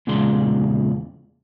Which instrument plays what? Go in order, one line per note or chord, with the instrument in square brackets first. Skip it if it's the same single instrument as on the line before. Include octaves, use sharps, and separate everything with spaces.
[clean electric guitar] E2 A#2 C#3 G#3 D5 C6